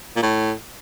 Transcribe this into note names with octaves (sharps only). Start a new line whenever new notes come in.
A#2
A2